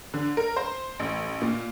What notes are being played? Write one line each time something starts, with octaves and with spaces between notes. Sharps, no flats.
D3
A#4
C5
A1
A#2